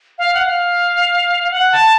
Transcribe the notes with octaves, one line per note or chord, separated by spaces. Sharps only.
F5
F#5
F5
F#5
A5